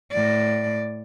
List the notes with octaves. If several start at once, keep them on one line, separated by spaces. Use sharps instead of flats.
A2 D5